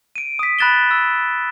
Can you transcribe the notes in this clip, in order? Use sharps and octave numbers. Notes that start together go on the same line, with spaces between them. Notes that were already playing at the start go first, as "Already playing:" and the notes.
D7 D#7
D#6 B6
B5 F#6 A6 E7 G7
E6